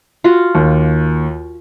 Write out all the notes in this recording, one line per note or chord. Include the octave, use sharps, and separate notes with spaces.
F4 F#4
D#2